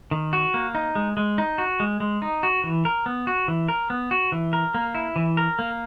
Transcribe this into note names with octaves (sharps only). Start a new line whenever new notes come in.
D#3
F#4
A#3
D#4
G#3
G#3
D#4
F#4
G#3
G#3
D#4
F#4
E3
A#4
B3
F#4
E3
A#4
B3
F#4
E3
A#4
A#3
E4
E3
A#4
A#3